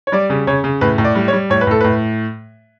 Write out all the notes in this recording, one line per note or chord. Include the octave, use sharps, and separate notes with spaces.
C#5
G3 D5
C#3
C#3 C#5
C#3
A2 B4
A2
D5
G3
C#5
G3
A2 C#5
B4
A2 A4
A2 B4